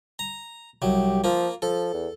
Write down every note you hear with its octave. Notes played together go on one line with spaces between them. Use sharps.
A#5
C2 F#3 G4
F3 A#3 F4
F3 A4
E2